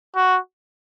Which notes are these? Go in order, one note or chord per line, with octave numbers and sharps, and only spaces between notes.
F#4